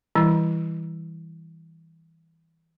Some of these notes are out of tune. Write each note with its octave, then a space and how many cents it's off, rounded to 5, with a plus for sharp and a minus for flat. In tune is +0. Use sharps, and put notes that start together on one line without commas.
E3 -15 G3 +5 E4 +0